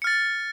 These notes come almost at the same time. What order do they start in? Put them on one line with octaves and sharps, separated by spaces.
C#7 F6 A6